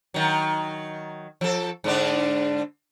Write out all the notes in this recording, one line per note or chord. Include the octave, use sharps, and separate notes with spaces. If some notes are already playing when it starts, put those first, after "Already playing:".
D#3 F#3
F3 A4
G#2 D3 D4